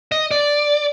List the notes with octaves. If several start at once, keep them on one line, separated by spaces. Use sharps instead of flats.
D#5
D5